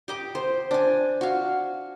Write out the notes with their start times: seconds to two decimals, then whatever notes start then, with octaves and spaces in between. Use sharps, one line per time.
0.08 G4 D#5 D6
0.35 C5
0.71 D4 G#5
1.21 F#4 F5